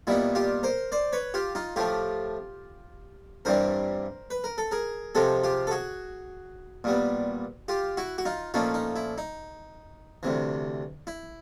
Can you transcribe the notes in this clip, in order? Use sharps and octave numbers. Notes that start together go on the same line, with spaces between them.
A#2 G3 B3 D#4 E4
F4 G4
A#4 C5
C5 D5
B4 C#5
F4 G4
D#4 F4
A2 F3 A3 F4 G4
G2 E3 G3 C4 A#4 C5
B4
A#4
A4
G#4 A#4
C3 F3 G#3 C4 G4 A4
F4 G4
A4
F#4 G#4
A#2 G3 B3
F4 G4
E4 F#4
F#4
D#4 F4
A#2 F3 A3 C#4 D#4 F4
D#4
E4
D#4
D2 C3 E3
E4